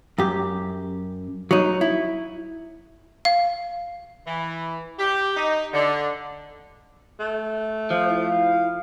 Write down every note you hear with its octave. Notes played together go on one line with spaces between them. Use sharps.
F#2 G4
F#3 D#4
E4
F5
E3
G4
D#4
D3
A3
F3 C5 F5
E4